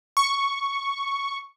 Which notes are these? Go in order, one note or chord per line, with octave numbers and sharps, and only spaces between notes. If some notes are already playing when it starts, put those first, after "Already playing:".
C#6